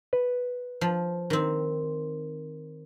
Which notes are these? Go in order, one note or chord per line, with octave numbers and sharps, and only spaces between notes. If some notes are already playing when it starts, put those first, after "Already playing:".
B4
F3
D#3 C4